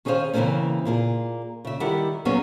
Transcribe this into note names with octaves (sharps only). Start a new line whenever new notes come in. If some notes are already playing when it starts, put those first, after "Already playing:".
D#3 C#4 G#4 A4 C5 F5
C#3 E3 F#3 A#3 C4 C#4
A#2 A#3 G#4
C#3 E5
D#3 G3 E4 G4 A#4 F#5
F#3 G3 A#3 B3 C#4 G#4